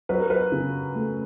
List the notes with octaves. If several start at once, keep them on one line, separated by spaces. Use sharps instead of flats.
F#3 B4
A#4
B4
C#3
A3